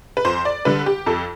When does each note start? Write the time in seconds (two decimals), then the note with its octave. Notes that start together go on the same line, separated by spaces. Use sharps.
0.17 B4
0.25 F2 C5
0.45 D5
0.65 D3 G3 B4
0.86 G4
1.06 F2 A4